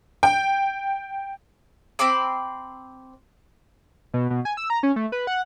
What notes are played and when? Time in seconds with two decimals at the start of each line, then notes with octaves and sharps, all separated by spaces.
0.23 G5
1.99 C4 B5 C6 D6
4.14 B2
4.30 B2
4.45 G#5
4.57 E6
4.70 A#5
4.83 C#4
4.96 A3
5.12 B4
5.27 F#5